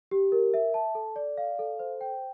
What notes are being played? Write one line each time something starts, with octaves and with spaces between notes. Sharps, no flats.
G4
A#4
E5
A5
A4
D5
F5
A4
C5
G5